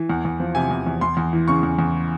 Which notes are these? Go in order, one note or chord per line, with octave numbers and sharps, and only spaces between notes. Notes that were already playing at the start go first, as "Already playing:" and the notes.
Already playing: E3
E2
E2
F3
C3 G#5
E2
E2
E2 C6
E2
E3
C#3 C#6
E2
E2